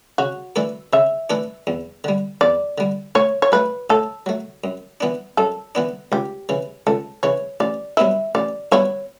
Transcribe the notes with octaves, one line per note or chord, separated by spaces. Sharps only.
C#3 F#4
E3 A3 D4 A4
C#3 E5
E3 A3 D4 A4
E2
D3 G3
E2 D5
D3 G3
A2 C#5
C#5
F#3 A3 B4
A2 A4
F#3 A3
F#2
E3 B3 D4
F#2 A4
E3 B3 D4
C#2 G4
C#3 E3
C#2 A4
C#3 E3 C#5
A1 D5
G2 F#3 B3 E4 E5
A1 D5
G2 F#3 B3 E4 C#5